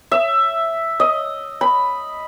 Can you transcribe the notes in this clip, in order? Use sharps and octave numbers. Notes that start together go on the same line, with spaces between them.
E5
D#5
B5